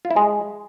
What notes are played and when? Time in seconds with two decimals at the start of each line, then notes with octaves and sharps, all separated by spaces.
0.05 F4
0.11 E4
0.16 G#3